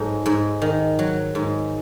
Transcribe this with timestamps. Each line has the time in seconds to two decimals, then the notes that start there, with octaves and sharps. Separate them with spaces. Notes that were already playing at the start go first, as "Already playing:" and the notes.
Already playing: G#2 F#3 A4
0.26 G#2
0.62 D#3
0.99 F#3
1.35 G#2